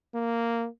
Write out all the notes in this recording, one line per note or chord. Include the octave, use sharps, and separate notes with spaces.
A#3